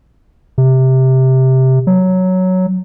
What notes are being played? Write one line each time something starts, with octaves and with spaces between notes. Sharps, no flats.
C3
F#3